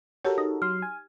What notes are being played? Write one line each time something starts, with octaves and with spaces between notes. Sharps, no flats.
F#4 G4 A4 A#4 C#5
D#4
F#3 C6 F6
G#5